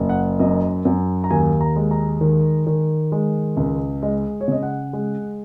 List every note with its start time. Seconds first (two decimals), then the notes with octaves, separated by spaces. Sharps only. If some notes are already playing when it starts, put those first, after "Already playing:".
Already playing: F#1
0.09 F#5
0.39 F#2 D#5
0.85 F#2
1.24 A#5
1.30 D#2 G#5
1.61 A#5
1.76 G#3
1.91 A#5
2.21 D#3
2.67 D#3
3.12 G#3
3.57 C#2
4.02 G#3 D#5
4.41 C#5
4.48 C#3 D#5
4.63 F#5
4.93 G#3